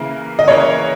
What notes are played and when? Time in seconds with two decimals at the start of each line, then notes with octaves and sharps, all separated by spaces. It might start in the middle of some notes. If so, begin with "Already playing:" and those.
Already playing: C#3 E3 A#3 E4 A#4
0.39 D#5
0.48 C#3 E3 A#3 E4 A#4 C#5